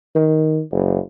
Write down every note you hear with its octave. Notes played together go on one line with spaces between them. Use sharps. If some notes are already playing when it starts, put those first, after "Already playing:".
D#3
F#1